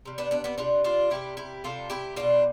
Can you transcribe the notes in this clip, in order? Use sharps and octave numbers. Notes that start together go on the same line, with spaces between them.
C3 G3
B3 D4
B3 D4
B3 D4
C3 G3 D4 F4
D4 F4
C3 G3 E4 G4
E4 G4
C3 G3 F4 A4
E4 G4
B2 G3 D4 F4